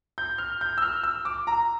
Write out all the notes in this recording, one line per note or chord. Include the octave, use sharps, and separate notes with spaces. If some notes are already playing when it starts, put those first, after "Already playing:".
G6
F6
G6
E6
F6
E6
D6
A#5